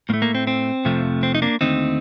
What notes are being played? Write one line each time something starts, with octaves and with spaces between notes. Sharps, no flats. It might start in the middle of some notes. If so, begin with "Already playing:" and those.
A2 A3 A#3
A#3
C4
C4
F2 C3 F3 A3
C4
D#4
A#3 D4
D#2 D3 A3 C4 D#4